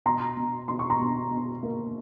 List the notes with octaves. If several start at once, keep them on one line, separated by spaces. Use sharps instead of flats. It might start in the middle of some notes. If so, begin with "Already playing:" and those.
B2 A#5 C6
B2
B2 C6
C#6
A#5 C6
B2
B2
A#3